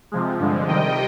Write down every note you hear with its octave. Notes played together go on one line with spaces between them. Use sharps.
C3 F3 G#3
G2 D3 F3 G#3
C3 D#3 G3 D#5 G5